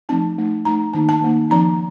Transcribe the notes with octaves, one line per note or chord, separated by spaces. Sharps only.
F3 A3 C4 D#4 A5
A3 D#4
A3 D#4 A#5
D#3 A#3 D#4 A5
A5
D#3 A#3 D#4
F3 C4 D#4 A#5